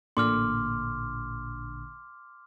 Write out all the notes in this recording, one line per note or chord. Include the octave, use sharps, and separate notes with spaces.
A1 A#2 D3 C6 D6 F6